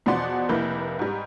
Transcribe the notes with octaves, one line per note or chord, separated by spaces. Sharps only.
E2 B2 F3 D5 F#5 C6
F1 A#3 E4 B4 G6
G#2 G3